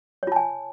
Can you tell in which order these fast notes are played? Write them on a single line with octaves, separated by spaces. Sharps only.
C#5 F4 A5 G#5